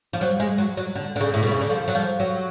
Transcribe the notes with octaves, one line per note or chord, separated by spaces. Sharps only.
F3
F#3
G#3
F#3
F#3
D3
D3
C#3
A2
B2
C#3
D3
F3
F#3
F3
F#3